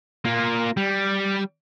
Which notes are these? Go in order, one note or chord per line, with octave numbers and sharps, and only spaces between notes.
A#3 F4
G3